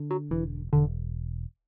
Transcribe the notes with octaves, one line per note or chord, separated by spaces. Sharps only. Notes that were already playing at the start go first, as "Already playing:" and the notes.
Already playing: D3
F#3
E1 E3
E1 D3